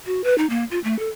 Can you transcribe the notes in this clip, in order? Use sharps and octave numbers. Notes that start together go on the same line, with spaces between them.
F#4
B4
D#4
A#3
F4
A3
A4